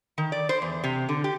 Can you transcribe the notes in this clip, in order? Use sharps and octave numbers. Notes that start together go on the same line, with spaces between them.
D#3
D5
C5
E2
C3
D3
G4